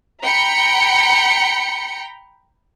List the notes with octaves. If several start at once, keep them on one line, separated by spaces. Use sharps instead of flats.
G5 A#5 B5 C#7